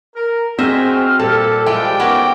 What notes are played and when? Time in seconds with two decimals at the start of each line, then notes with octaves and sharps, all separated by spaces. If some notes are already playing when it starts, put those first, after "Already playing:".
0.15 A#4
0.59 C4 F#4 G#4 C5 D#5 E5 G5 F6
1.19 A#2 G3 A4 A5
1.66 F3 G#3 E4 D5 G5
2.00 D#2 B3 C#4 F#4 D6